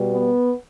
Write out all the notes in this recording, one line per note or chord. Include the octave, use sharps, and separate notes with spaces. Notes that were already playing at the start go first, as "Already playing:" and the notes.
Already playing: B2 G3
B3